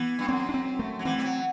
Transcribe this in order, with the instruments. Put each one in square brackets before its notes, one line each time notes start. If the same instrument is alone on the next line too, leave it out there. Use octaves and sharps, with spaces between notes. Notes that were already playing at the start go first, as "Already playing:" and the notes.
Already playing: [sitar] E3 [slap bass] B3
[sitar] G2
[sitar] F#2 [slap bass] C4
[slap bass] D4
C4
A3
[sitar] F#3
[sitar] E3 [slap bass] C4
[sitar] G3
F#3